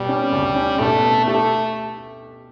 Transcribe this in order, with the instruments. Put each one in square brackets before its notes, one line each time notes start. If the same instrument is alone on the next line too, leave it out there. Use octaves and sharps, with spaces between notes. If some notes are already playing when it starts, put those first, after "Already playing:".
Already playing: [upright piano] B2 [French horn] G3
[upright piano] C#4
D2
C#4
[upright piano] B2 [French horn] A3
[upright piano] B2
[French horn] A3 [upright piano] G4